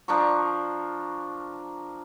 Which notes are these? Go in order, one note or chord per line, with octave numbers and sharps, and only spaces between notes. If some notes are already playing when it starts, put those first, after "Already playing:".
F3 D4 A#4 C#6